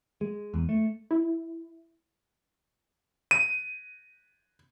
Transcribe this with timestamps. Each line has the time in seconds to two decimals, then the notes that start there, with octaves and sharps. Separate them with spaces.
0.21 G#3
0.54 E2
0.69 A3
1.11 E4
3.31 D#7